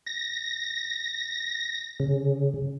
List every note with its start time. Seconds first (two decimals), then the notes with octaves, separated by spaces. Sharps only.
0.07 A#6
2.00 C#3